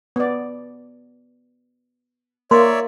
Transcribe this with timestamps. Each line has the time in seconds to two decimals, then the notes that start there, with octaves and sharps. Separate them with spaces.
0.16 B3 D5
2.51 A#3 A#4 C#5 D5 E5 C6